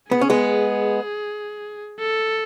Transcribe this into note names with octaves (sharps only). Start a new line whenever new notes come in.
B3 G#4
C#4
G#3 B3
A4